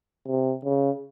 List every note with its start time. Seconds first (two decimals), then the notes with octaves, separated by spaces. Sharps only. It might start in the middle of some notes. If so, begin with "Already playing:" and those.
0.27 C3
0.64 C#3